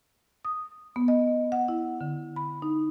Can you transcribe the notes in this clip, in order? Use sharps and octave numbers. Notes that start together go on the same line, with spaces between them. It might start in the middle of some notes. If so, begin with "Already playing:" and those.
D#6
B3
D#5
F#5
E4
D3
B5
D#4